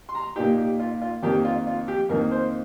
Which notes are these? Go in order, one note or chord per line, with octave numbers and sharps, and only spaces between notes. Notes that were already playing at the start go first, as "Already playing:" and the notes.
C6
A#5
A#2 A#3 D#4 G4
G4
F4
F4
F2 D#3 A#3 D#4 G4
F4
F4
G4
F2 D#3 A#3 D#4 A#4
C5